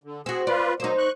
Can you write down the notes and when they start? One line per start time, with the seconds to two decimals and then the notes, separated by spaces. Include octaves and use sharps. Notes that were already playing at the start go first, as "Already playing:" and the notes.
0.04 D3
0.26 C4 F#4 G#4
0.47 F4 B4 D5
0.80 F#3 A#3 D#4 C5
0.98 C#6 F#6